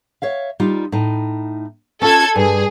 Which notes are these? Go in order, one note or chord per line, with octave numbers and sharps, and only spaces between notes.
C#5 E5 F5
G3 D#4 F4
A2 D#4
C#4 F4 A4 G#6
G2 G#4